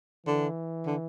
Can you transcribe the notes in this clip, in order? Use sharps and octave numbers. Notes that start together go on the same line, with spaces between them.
D3 E3
D3